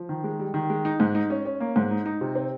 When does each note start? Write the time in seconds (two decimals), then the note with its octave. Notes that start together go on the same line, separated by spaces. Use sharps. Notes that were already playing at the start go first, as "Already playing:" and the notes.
Already playing: F3
0.09 D#3
0.24 G#3
0.40 G3
0.54 D#3
0.70 G#3
0.85 D#4
1.00 G#2
1.15 D#4
1.30 C#4
1.45 C#4
1.60 A#3
1.76 G#2
1.91 D#4
2.06 D#4
2.21 C3
2.35 C4